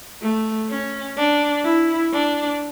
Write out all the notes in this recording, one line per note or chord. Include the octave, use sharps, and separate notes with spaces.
A3
C#4
D4
E4
D4